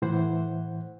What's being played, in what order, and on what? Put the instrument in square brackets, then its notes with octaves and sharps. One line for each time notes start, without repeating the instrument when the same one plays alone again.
[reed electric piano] A2 E3 C5 F#5